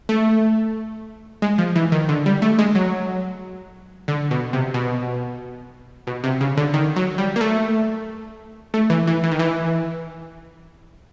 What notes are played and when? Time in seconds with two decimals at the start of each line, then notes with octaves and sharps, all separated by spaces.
0.09 A3
1.42 G#3
1.58 F3
1.75 E3
1.92 D#3
2.09 D3
2.26 G3
2.42 A3
2.59 G#3
2.75 F#3
4.08 D3
4.31 B2
4.53 C3
4.74 B2
6.07 B2
6.24 C3
6.41 C#3
6.57 D3
6.74 D#3
6.96 F#3
7.18 G3
7.36 A#3
7.41 A3
8.74 A3
8.90 E3
9.07 E3
9.24 E3
9.32 D#3
9.39 E3